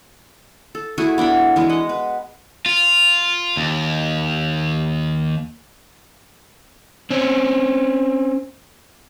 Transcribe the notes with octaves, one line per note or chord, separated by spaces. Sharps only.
A4
A3 E4 F#4 G#4
B3 D4 D5 B5
E3 G#3 B3
D#5 F#5
B4
F4
D#2
C4 C#4